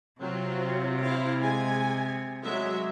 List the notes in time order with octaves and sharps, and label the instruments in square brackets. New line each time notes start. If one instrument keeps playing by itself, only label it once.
[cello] C3 [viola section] F#3 C4 F4
[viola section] E4 C5 F5
G#3 G#5
F#3 G#3 E5